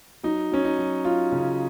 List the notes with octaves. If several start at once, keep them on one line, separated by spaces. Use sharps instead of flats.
F#3 D#4
F#3 C#4
D#4
F#3
F#3 F4
C#3